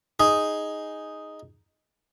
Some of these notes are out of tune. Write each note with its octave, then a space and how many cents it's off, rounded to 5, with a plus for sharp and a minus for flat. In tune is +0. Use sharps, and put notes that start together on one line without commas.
D#4 +0 G#4 +0